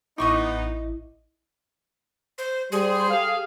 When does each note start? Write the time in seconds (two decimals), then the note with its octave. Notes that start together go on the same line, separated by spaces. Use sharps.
0.18 A1 B3 D#4 E4 D#5 C#6 D6
2.38 C5
2.72 G3 G#4 C5
3.10 G4 A4 F5